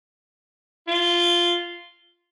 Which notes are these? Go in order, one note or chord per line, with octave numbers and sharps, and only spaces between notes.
F4